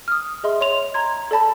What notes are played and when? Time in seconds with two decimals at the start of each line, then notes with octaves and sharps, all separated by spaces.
0.08 D#6 F6
0.44 G#4 D#5 E5 C6
0.61 C#5 C6 F7
0.94 A#5 C6 G#6
1.31 A4 D5 A5 B5